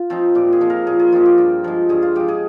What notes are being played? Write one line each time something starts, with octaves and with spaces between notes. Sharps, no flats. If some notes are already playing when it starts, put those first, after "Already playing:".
Already playing: F4
F3 C4 D#4
A#2 G4
G#4
F3 C4 D#4
A#4
A#2 G#4
G#4
F3 C4 D#4 F4
G4
G2
F3 G#3
G2 G#4
F4
F3 G#3 G4
G#4